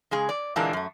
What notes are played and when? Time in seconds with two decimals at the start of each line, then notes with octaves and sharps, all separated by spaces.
0.11 C#3 G#3 G#4
0.29 D5
0.56 A#2 D3 E3 G#3 A#3 D4
0.73 F#2 A3